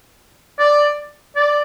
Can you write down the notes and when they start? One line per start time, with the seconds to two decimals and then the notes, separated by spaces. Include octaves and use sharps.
0.59 D5
1.36 D5